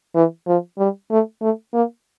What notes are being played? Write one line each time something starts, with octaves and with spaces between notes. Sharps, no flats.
E3
F3
G3
A3
A3
A#3